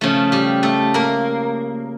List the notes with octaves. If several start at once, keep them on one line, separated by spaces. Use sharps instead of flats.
C#3 F3 A3
G3 G4
A3 A4
A#3 A#4